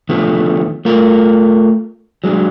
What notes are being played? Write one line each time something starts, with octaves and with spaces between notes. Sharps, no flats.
D3 D#3 F3 A3 B3
A3 F4 A#4
F#3 G#3 D4